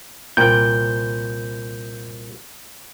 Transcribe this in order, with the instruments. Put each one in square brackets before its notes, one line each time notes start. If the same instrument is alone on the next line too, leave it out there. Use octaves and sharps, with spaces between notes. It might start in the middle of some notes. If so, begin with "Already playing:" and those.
[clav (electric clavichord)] C2 A#2 G5 [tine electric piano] G6